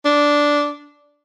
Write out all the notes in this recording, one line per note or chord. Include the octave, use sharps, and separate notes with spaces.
D4